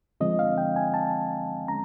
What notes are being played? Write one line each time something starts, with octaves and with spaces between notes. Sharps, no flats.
D3 F3 G#3 C4 D#5
F5
G5
G#5
A5
G#3 C#4 A#5